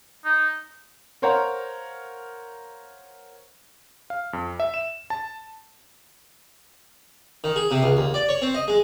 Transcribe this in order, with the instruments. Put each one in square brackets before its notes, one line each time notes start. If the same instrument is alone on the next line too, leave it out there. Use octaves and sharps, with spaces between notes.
[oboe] D#4
[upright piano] A#4 C5 C#5 F5 F#5 A#5
[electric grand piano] F5
F2
E5
E7
A5
[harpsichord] D#3
G#4
C3
C#2
D#2
D5
C#5
C4
D#5
G#3